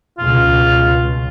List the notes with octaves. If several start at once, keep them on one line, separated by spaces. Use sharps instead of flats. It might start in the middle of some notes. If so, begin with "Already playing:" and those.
C#2 B2 F4